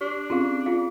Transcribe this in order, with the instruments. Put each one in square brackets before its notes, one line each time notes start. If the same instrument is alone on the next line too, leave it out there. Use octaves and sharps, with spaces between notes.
[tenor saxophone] D4 [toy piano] G4
[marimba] C4 C#4 [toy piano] F4 G#4 F5
[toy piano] F4 G#4 F5